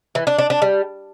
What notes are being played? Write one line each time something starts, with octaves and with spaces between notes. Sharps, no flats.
E3
D4
D4
D4
G3